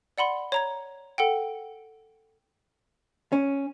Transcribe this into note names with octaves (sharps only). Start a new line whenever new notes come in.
D5 F#5 B5 C6
C#5 A#5 G#6
A4 F#5 G5
C#4